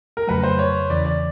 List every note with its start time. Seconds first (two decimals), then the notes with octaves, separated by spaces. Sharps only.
0.17 A#4
0.27 F2 C#3 F#3 A3 B4
0.43 C5
0.59 C#5
0.90 E2 C#3 E3 D5
1.05 D5